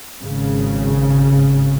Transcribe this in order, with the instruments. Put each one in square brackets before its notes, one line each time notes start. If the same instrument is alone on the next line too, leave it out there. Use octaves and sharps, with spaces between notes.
[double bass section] G#1 C#3